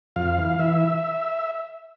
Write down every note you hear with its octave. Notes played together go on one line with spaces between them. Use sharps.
F2 F5
E3
E3 E5